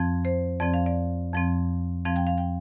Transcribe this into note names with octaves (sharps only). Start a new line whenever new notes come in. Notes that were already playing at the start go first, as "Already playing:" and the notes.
Already playing: F2 F3 C4
C5
F2 F3 C4 D5
F5
D5
F2 F3 C4
F2 F3 C4 F5
G5
F5
G5